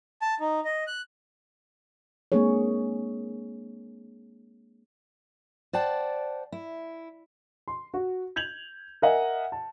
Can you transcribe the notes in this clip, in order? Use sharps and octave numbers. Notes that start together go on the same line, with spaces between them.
A5
D#4
D#5
F#6
G#3 A#3 C4 D4 G#4 C#5
C5 D5 F#5 G5 A5
E4
C6
F#4
G6 G#6 F7 F#7
A#4 D#5 E5 F#5 G#5
A5